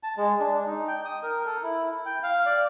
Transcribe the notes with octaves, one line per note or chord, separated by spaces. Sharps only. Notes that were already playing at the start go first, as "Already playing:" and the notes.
A5
G#3
D4
D#4
G5
D#6
A#4
A4
E4
G5
F5
D5